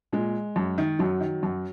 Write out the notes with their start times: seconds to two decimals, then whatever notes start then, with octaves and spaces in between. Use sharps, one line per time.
0.13 A#2 G#3
0.56 F#2
0.78 D#3
0.99 F#2 F#3
1.20 D#3
1.43 F#2